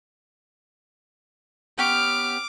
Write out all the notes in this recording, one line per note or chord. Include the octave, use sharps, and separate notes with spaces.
B3 C#4 G4 D6 F6